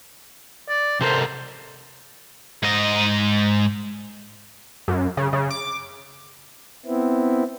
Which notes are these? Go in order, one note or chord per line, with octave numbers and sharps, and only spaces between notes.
D5
C3 A4 A#4 C5
G#2 D#5
F#2
C#3
C#3
D6
B3 C4 E4